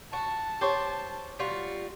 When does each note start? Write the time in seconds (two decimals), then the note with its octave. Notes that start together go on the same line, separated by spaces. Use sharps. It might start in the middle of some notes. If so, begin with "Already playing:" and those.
0.13 F#4 A5
0.61 G4 C5 C#5
1.39 G3 F4 F#4